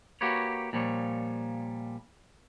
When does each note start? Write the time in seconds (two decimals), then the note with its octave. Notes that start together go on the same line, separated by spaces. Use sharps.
0.21 A#3 F#4 G4 B4 C#5
0.73 A#2 F3 G3 C#5